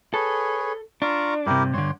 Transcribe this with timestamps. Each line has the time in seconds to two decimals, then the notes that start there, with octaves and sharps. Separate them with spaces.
0.14 G#4 A4 B4 C#5
1.02 D4 F4 A#5 C#6
1.46 G2 C3 E4 G4 A#4
1.74 G2 D3 C#5 C6